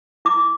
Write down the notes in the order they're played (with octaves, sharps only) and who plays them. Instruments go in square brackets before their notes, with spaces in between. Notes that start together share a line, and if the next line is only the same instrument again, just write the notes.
[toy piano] E4 D6